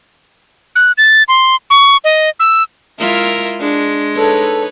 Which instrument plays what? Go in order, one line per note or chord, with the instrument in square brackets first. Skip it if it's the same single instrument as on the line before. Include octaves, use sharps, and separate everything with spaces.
[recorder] F#6
A6
C6
C#6
D#5
E6
[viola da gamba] G#3 E4 F4 [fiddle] A#4 E5
[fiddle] G#3 [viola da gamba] D4
[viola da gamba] D#4 B4 C#5 [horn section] A4